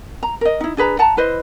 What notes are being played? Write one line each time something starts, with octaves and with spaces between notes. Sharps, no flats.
A#5
A#4 D#5
D#4 E4
D4 G#4 B4 A#5
F#5 A5 A#5
E4 B4 C5 D#5